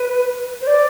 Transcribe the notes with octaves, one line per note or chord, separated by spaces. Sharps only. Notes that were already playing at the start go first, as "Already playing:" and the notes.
Already playing: B4
C5
D5